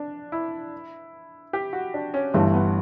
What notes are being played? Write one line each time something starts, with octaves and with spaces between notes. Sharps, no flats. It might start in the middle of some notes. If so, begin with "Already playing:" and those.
Already playing: D4
E4
G4
F#4
D4
C#4
G1 G2 E3 A3
B3